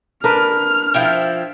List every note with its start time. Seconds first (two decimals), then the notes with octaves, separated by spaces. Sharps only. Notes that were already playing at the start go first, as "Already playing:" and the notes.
0.24 D4 A#4 B4 F6
0.94 F3 E4 G5